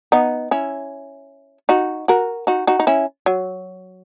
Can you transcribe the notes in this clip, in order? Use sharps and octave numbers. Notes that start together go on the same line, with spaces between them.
B3 D#4
C#4 E4
D#4 F#4
F#4 A#4
D#4 F#4
D#4 F#4
D#4
C#4 E4
F#3